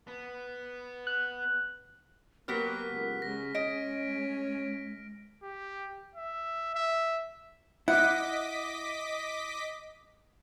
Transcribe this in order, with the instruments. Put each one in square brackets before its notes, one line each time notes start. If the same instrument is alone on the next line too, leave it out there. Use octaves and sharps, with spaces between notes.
[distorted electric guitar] B3
[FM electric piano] F#6
[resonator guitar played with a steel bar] F#3 B3 G4 [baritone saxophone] A#3 [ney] A#4 [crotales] F6 B6
[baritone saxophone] C#2
[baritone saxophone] C#3 [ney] G#3 [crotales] A#6
[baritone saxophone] C#4 [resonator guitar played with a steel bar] D#5 [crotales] D7
[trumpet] G4
E5
E5
[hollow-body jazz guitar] E4 [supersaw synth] D#5 D6 B6 [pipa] F#5